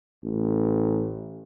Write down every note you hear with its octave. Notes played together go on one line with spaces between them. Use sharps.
A1